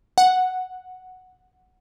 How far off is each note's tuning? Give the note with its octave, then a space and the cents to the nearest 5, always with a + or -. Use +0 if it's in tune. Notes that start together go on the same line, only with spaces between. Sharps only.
F#5 +0